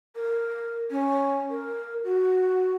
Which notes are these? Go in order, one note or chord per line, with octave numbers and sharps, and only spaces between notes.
A#4
C#4
A#4
F#4